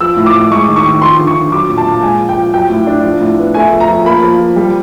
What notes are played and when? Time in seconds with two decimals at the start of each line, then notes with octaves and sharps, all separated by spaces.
0.01 F3 E6
0.17 A2
0.26 D6
0.34 A2
0.51 G#3 C#6
0.69 D#3
0.76 C#6
0.85 D#3
1.02 F3 C6
1.19 D3
1.27 C#6
1.36 D3
1.52 F#3 D6
1.69 A#2
1.78 A5
1.86 A#2
2.03 G#3 G#5
2.20 F3
2.29 G5
2.37 F3
2.53 F#3 G5
2.70 A2
2.87 D4
3.04 F3
3.21 A2
3.38 B3
3.54 A3 G#5
3.72 F3
3.80 A#5
3.88 F3
4.05 A#3 B5
4.23 F3
4.40 F3
4.56 G3